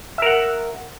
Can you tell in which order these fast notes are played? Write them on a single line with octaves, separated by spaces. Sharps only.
E5 A#4 F#5